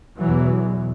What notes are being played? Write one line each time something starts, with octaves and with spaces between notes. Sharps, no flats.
E2 B2 E3 F#3